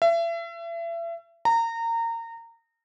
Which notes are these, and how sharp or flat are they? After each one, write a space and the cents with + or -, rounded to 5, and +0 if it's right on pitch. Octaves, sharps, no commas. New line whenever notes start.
E5 +35
A#5 -25